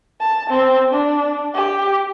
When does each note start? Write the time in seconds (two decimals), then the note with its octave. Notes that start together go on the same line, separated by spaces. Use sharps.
0.21 A5
0.50 C4
0.94 D4
1.55 G4